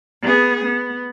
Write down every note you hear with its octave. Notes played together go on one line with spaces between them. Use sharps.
B3 G#4
B3